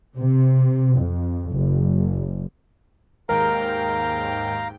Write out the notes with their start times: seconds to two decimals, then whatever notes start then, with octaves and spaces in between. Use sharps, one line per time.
0.17 C3
0.96 F2
1.51 F#1
3.29 D#2 G#2 A#4 F5 G5 A#5